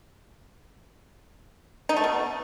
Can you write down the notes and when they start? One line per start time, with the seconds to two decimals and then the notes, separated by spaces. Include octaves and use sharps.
1.89 D#4
1.96 A3
2.04 B2